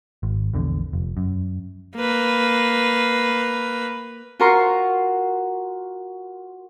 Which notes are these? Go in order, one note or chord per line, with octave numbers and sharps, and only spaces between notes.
G#1
A#1 E2 D3
F1
F#2
A#3 B4
F4 F#4 A#4 A#5 C6 C#6